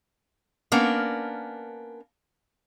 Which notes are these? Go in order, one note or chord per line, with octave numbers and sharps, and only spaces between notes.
A#3 B3 C#4 D4 A#4